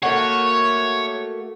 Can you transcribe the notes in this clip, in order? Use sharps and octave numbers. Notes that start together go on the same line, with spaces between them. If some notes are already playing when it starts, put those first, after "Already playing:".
A3 A#3 F#4 C#5